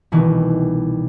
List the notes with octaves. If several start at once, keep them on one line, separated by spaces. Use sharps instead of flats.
C2 B2 D#3 E3